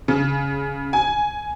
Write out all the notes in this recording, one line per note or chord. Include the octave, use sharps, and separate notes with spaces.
C#3
G#5